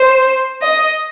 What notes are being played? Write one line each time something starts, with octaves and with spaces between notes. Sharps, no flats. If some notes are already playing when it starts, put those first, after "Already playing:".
Already playing: C5
D#5